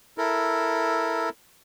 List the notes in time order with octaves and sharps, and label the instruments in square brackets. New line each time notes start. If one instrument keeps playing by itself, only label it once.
[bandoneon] E4 A4 A#4